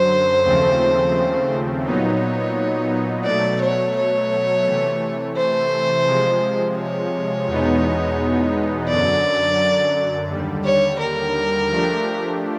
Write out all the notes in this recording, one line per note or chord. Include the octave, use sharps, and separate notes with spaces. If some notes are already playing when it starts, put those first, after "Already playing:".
Already playing: F#2 D3 F#3 C5
D#2 C#3 F3 A3 C4
A#2 F#3 B3 D#4 C#5
B2 F#3 A3 D5
C#5
C#5
C3 E3 A3
C5
C3 F3 G#3
C#5
E2 B2 G#3 B3 D#4
F#2 D3 F#3 D5
D#2 D3 G3
C#5
A#4
F3 A3 D4 G4